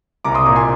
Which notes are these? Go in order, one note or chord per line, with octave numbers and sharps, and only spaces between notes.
C2 A#5 D6
C6 D#6
A#2 A#5 D6
G#5 C6